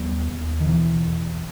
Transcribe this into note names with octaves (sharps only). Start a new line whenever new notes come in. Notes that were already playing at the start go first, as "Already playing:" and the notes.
Already playing: D#2 G3 B3
D#2
D#3
B2 E3
E2